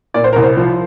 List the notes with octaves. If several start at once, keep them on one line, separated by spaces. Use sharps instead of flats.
A#2 D5
C5
C2 A#4
C5
F3